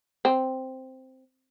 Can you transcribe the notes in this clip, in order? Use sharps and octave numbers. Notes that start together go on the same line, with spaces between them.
C4